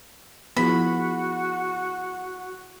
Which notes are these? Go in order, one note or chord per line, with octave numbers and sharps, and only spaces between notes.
F3 B3 E4 F#4 G#4 B5